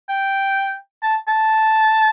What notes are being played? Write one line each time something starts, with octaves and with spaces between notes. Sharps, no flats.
G5
A5
A5